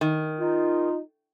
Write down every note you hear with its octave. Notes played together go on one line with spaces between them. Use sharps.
D#3
D#4 F4